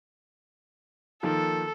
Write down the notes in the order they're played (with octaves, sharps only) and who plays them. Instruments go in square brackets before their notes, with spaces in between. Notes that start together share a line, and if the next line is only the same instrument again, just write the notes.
[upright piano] D#3 F3 A#3 [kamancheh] A4